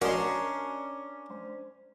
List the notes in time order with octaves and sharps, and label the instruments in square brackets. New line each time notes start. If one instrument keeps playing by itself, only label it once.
[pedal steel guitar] C#4 [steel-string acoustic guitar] D4 A#5 [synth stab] F#4 D#5 [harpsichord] A#4 A5 C6
[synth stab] C5